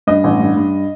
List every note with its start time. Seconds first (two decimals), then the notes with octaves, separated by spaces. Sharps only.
0.07 G2 D#5
0.24 A1
0.39 G2
0.56 G2